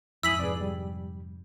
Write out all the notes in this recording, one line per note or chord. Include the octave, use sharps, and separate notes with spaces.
F2 G#2 E4 G#5 D#6 E6 B6 F#7
F2 G#2 C3 G#4 B4 D5
G3